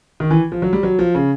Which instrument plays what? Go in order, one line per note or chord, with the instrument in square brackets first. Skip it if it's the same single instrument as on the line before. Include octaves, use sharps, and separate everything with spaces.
[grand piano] D#3
E3
F3
F#3
G3
F#3
F3
C#3